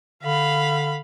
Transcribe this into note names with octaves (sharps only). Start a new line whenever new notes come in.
D3 F5 B5